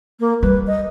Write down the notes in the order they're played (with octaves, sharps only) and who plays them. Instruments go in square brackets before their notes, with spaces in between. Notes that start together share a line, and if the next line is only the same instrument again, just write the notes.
[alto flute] A#3
[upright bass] G3 [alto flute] B4
[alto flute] D#5